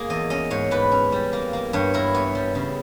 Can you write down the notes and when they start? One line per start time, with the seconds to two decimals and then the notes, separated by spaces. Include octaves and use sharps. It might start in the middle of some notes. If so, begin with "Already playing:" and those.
Already playing: A#3 G#4
0.10 E2 D#5
0.30 C#4 D#5
0.50 G#2 C#5
0.71 G#2 B4
0.91 C#4
1.12 G3
1.33 A#3
1.53 A#3
1.73 G2 C#5
1.94 E4 A#4
2.14 B3 C#5
2.35 G3
2.55 C#3